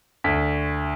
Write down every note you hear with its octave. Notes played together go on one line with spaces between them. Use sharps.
D2 B6